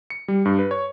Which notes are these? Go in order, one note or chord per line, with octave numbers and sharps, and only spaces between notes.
C#7
G3
G2
B4
C#5